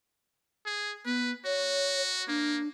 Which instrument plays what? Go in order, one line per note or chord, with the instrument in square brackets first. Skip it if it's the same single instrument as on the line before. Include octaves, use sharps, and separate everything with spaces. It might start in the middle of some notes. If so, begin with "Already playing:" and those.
[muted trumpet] G#4
[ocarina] B3 [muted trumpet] B4
[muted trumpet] F#4 [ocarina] C#5
[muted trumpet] A#3 [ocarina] D4